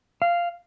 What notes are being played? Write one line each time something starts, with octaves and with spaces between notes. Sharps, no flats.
F5